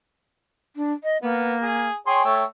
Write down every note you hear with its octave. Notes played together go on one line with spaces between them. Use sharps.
D4
D#5
A#3 B3
G#4
G#4 C#5 G5 C6
A3 C#5 E6